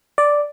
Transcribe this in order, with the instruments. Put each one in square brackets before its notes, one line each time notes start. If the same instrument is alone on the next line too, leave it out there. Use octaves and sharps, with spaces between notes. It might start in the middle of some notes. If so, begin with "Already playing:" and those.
[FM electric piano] D5